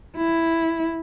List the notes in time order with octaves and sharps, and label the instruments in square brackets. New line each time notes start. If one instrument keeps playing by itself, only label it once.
[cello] E4